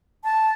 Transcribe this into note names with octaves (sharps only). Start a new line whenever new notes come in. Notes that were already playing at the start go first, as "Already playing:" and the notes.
A5